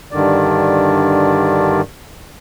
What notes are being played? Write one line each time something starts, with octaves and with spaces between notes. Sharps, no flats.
G2 D3 D#3 D5